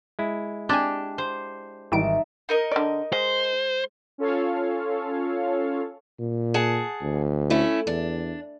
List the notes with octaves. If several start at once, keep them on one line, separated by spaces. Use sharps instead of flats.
G#3 E4
C4 D4 G4 G#5
C5
G#1 E3 G3 D#4 E5 A5 D7
D#4 A#4 D#5
D3 D5
G#3 G#4 C5
C#4 F4 A4 C#5 F5
A#2
G#4 F#5 A5
D2
A3 C#4 E4
E2 D4